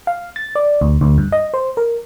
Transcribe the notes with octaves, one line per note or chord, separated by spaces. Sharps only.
F5
A6
D5
D2
D2
G2
D#5
C5
A#4